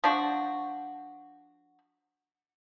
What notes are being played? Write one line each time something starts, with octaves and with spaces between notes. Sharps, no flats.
F3 D4 F#4